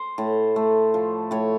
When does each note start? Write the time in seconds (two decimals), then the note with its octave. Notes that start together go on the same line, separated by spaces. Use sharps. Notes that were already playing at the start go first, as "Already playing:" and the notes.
Already playing: C5
0.18 A2
0.56 A3
0.94 F3
1.31 A2 C#5